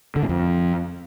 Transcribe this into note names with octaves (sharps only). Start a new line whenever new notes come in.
D3
A2
F2